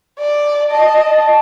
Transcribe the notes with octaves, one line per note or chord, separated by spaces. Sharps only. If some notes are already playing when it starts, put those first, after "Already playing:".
D5
D#5 A5